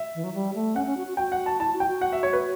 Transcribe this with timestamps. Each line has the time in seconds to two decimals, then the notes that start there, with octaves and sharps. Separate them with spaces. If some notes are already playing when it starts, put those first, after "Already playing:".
Already playing: E5
0.15 E3
0.24 F#3
0.34 G3
0.54 A3
0.76 C#4 F#5
0.86 C#4
0.97 F#4
1.07 F#4
1.17 F#4 G5
1.32 F#5
1.46 A5
1.60 E4 A5
1.74 F#4
1.80 G5
1.87 F#4
2.01 F#5
2.13 E5
2.23 C#5
2.33 B4